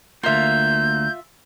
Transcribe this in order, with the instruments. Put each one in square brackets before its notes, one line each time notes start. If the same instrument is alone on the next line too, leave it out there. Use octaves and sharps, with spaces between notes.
[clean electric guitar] D2 A#3 [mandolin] F4 E5 [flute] G6